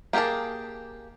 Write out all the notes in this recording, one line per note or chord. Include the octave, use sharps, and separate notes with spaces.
A#3 G4 G#4 A#4 A5